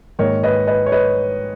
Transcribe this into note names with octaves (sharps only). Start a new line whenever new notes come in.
G#2 D#3 A#3 D#4 A#4 C#5
B4 D#5
B4 D#5
C#5
B4 D#5